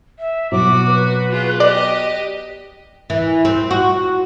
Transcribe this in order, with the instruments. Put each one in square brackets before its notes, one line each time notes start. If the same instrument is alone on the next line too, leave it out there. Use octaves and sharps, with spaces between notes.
[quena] E5
[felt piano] B2 F#3 C4 [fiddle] F#4 [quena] D6
[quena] B4
[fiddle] F4 G#4
[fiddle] G4 D#5 [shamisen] D5
[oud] E3
C4
F#4